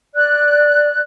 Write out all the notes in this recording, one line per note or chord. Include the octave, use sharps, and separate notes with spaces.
D5 F#6